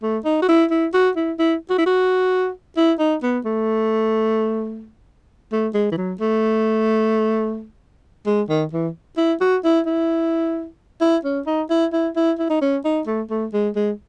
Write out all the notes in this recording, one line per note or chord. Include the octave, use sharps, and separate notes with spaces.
A3
D#4
F#4
E4
E4
F#4
E4
E4
F#4
E4
F#4
E4
D#4
B3
A3
A3
G#3
E3
F#3
A3
G#3
D#3
E3
E4
F#4
E4
E4
E4
C#4
D#4
E4
E4
E4
E4
D#4
C#4
D#4
A3
A3
G#3
G#3